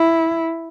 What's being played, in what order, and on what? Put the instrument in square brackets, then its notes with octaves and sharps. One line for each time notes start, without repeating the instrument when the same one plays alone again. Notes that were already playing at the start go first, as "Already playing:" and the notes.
Already playing: [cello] E4